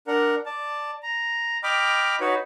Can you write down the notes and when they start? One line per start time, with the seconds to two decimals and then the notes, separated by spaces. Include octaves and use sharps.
0.07 D4 A#4 F#5
0.46 D5 A5
1.03 A#5
1.63 D#5 G5 B5 D6 F6
2.21 D#4 F#4 B4 C#5